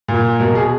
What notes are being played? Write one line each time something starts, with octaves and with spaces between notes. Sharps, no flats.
A#2
B2 A#4
G#4